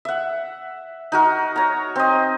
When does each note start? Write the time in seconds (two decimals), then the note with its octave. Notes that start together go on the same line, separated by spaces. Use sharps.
0.05 E5 F#5
1.12 D#4 F#4 A#4
1.56 C#5 A#5
1.96 C4 D#5